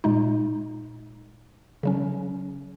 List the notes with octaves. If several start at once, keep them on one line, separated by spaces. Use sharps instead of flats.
A#2 G#3 D#4
C#3 F#3 C#4